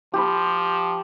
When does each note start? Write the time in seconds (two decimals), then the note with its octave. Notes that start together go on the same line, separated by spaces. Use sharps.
0.14 F3 G4 B5